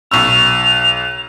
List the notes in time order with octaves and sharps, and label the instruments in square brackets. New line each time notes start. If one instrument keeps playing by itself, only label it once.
[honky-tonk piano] B1 C#6 E6 [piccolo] F7